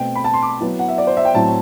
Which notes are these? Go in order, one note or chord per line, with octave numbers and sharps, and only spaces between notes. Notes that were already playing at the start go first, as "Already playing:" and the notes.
Already playing: B2 A3 C4 G5
B5
A5
C6
D6
F#3 B3 E4
F#5
E5
D5
C5
E5
G5
A2 F#3 C4 E4 A5